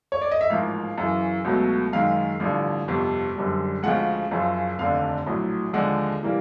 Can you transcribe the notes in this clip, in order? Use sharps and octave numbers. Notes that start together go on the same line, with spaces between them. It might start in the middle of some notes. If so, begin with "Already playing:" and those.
C#5
D5
D#5
E5
A1 G#2 F3 A#3 F5
F#2 C#3 E3
C#2 B2 F#3 A3
F#2 D#3 G#3 F5
A1 G2 D3 F3
G1 F2 C3
F#1 F#2 D3 G3
D2 C#3 F3 G#3 F#5
F#1 F#2 C#3 F3
F1 D#2 D3 F5
A#1 A2 F#3
D#2 D3 F3 G#3 F#5
C3 E3 G3 A#3